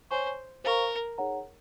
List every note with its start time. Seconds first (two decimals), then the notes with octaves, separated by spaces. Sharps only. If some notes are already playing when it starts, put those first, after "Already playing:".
0.11 C5 C#5 G#5 C#6
0.64 A#4 C5 F5 A#5 C#6
1.18 D#4 G#4 C#5 F#5 A#5